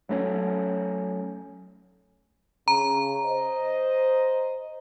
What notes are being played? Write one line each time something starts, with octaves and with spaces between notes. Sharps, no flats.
F#3 A3 A#3 C#4
C#3 A#5
C5 D#5